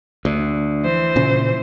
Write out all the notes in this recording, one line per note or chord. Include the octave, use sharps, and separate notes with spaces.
D2 D4
E3 C5
A#2 C#3